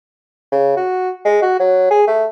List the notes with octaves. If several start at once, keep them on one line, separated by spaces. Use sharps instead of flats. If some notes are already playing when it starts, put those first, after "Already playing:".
C#3
F#4
G#3
F#4
F#3
G#4
A3